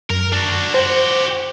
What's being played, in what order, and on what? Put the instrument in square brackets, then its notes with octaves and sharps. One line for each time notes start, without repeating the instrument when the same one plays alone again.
[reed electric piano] F#2 [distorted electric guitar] A#4
[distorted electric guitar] D4 F#4
[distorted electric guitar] F#4 G4 [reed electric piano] C5